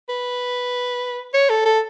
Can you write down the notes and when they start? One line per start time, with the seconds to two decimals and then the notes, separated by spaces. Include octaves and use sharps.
0.09 B4
1.34 C#5
1.50 A4
1.65 A4